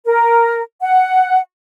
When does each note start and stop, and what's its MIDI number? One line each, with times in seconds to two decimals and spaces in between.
0.05 0.61 70
0.81 1.38 78